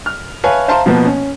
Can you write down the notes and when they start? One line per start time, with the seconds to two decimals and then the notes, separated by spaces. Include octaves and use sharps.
0.06 F6
0.44 B4 C#5 E5 F5 G#5 A5
0.68 C5 E5 F5 A5 A#5 C6
0.86 B2 F3 A#3 B3
1.05 C#4